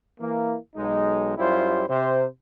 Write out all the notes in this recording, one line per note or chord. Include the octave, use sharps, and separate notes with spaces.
E3 A#3
B1 G#3 D#4
F#2 G3 E4 F4 G4 C5
C3 C5